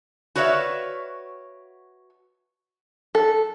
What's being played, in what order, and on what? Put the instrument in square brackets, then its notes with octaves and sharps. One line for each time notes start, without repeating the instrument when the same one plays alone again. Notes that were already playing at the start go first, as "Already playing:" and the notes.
[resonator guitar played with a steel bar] F#4 B4 C#5 D5 E5 F5
[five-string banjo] A4